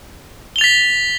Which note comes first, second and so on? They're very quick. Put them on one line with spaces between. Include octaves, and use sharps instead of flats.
G7 F7 A6 B6